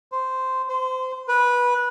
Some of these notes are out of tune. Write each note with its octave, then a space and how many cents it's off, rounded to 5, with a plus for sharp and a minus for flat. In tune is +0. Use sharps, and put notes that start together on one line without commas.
C5 -10
C5 -25
B4 -15